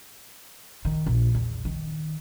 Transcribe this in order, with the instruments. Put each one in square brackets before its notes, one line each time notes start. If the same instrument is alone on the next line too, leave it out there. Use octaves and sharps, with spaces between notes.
[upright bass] D#3
A#1
E2
D#3